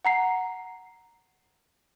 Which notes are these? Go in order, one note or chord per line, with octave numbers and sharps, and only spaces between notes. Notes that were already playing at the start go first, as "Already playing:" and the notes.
F#5 A#5 C7